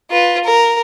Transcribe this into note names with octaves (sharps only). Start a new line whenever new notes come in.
F4 B4
A#4